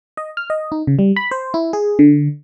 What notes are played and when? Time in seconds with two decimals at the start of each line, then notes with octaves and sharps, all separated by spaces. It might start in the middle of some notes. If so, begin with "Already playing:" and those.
0.17 D#5
0.37 F6
0.50 D#5
0.72 D#4
0.87 C#3
0.99 G3
1.16 B5
1.31 C5
1.54 E4
1.73 G#4
1.99 D3